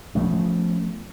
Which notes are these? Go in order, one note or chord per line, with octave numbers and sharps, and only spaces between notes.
F3 A3 B3 C#4